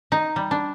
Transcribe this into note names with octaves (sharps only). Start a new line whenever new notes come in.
D#4
G3
D4